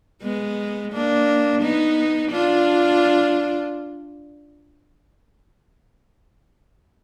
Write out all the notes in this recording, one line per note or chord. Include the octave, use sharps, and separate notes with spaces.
G#3 B3
A#3 D4
B3 D#4
D4 F4